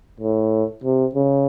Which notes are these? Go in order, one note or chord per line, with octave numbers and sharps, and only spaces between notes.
A2
C3
C#3